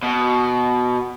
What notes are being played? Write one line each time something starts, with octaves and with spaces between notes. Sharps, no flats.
B2